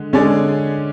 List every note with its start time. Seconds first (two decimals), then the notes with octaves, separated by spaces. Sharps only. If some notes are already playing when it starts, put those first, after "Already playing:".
Already playing: D3 G#3
0.13 D3 G#3 C#4 G#4 D5